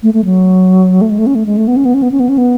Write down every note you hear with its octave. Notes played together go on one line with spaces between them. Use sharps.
A3
A3
F#3
A3
G#3
A3
C#4
A3
G#3
A3
B3
C#4
B3
C#4
B3
C#4
B3
C#4
B3